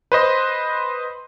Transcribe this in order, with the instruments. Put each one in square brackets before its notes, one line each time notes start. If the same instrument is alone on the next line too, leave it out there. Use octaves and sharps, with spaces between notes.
[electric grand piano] B4 C5 D#5 C6